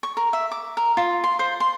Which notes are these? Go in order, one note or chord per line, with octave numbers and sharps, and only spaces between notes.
C#6
A#4
E5
D6
A#4
F4
C6
C5
C6